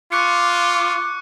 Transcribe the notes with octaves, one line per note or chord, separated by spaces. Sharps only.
F4 C#6 D6 F#6 C#7